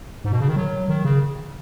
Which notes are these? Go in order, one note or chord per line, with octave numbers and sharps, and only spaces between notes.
G#2
B2
C#3
D#3
F#3
D#3
C#3